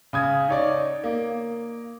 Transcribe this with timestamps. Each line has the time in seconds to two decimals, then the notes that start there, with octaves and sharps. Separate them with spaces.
0.13 C#3 D#6 G#6
0.49 D#4 C#5 D5
1.04 A#3